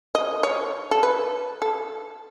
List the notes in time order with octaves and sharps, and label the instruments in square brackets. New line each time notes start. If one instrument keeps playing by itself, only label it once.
[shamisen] D#5
C#5
A4
B4
A4